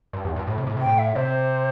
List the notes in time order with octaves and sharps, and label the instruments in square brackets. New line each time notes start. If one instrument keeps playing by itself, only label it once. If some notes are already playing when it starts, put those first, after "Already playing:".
[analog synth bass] G2
E2
G2
A2
C3
A2
C3
[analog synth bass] A2 [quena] G5
[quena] E5
[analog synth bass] C3 [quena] C5